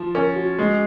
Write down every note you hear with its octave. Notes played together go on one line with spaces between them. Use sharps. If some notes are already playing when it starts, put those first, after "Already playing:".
Already playing: F3
C#4 A#4
F#4
G#3